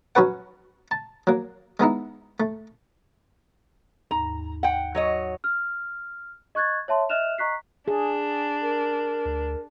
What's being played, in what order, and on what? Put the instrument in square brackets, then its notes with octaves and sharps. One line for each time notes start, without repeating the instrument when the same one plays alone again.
[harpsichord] F#3 C#4 F#4 B4 F#5
A5
F#3 A#3
G#3 B3 D#4 E4
A3
[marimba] D#2 G#2 [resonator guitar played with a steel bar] A#5
[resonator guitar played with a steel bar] F#5 G5
F#3 C#5 D#5
[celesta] F6
D#5 C#6 F#6 G#6 A6
C#5 E5 A5 C6
D#5 E5 F6 F#6 E7 F7
D#5 A#5 C#6 F#6 B6 C7
[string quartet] D4 [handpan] G#4
[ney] A#4
[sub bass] D2